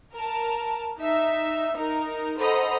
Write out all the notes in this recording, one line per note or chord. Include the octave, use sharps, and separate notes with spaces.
A#4 A5
D#4 E5
D#4 A#4
A4 C5 D#5 F#5 A#5 B5